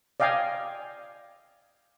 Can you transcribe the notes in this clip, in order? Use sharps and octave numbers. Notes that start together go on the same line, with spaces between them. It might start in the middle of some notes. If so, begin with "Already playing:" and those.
D5 D#5 F5 G5 G#5